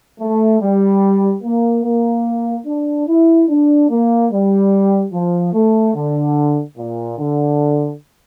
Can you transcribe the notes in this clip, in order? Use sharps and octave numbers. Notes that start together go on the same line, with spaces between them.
A3
G3
A#3
A#3
D4
E4
D4
A#3
G3
F3
A3
D3
A#2
D3